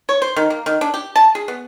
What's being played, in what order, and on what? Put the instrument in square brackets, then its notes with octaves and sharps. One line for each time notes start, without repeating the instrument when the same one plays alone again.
[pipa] C#5
C5
D#3
A#3
D#3
D4
G4
A5
G#4
B3